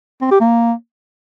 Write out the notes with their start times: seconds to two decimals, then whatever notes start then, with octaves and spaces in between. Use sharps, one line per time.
0.22 C4
0.31 G4
0.41 A#3